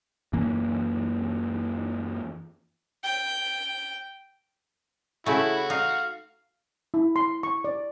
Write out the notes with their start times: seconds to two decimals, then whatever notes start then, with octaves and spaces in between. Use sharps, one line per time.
0.33 F#2 E3 A#3
3.03 G5
5.26 C#3 A3 E4 F#4
5.70 D#4 F5
6.94 E4
7.16 C6
7.43 C#6
7.64 D5